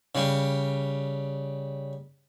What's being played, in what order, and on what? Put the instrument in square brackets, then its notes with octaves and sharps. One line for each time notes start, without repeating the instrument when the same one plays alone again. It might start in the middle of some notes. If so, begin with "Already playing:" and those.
[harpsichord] C#3 G3